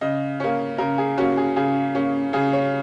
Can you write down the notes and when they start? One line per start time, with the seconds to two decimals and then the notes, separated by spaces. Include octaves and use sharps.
0.01 C#3 D#5
0.40 A#3 C#4
0.78 C#3 A#4
0.98 G#4
1.18 A#3 C#4 F#4
1.37 G#4
1.56 C#3 G#4
1.95 A#3 C#4
2.33 C#3 G#4
2.53 C#5